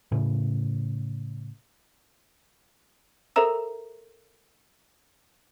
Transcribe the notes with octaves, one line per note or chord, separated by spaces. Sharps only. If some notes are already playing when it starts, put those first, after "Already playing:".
A2 C#3
A4 A#4 C5 E5 A#5 E6